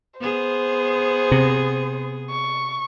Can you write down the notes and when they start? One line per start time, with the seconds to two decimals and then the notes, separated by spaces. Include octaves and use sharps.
0.20 B3 G#4 C5
1.31 C3
2.30 C#6